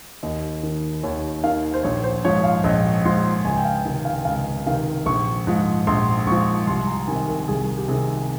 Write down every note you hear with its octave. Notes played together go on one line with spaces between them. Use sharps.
D#2 D#5
D#3
D#2 C#5
D#3 F5
C5
A#1 C#5
C5
G#2 F3 C#5
F5
A#1 D#5
G#2 F3 C6
C#2 G#5
G5
F5
C3 D#3 G5
F5
C#2 F5
C3 D#3 F5
A#1 C#6
G#2 F3
A#1 C6
G#2 F3 C#6
C2 C6
A#5
C3 D#3 G#5
A#4
C2 G#4
G4
C3 D#3 G#4